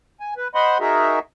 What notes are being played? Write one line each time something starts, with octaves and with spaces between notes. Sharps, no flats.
G#5
B4
C5 D#5 F#5 B5 C6
D#4 F#4 G#4 A#4 E5